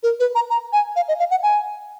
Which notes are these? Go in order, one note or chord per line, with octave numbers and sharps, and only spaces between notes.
A#4
B4
A#5
A#5
G#5
F5
D#5
F5
F#5
G#5